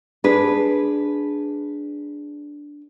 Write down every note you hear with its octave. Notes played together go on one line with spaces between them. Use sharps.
D4 G#4 B4